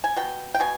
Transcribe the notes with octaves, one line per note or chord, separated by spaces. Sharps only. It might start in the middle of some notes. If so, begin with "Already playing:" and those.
G#5
B2 G5
G5
B2 G#5